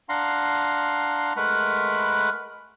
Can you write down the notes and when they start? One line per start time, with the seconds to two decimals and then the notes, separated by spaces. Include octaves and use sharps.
0.09 D4 F5 F#5 A#5 C6
1.37 G#3 A3 A#4 B4 F#5 B5